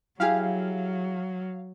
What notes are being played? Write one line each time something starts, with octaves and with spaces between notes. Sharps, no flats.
F#3 E4 G4 G#4 F5